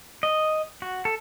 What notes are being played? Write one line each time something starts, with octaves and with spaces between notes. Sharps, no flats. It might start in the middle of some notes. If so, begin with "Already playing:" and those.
D#5
F#4
A4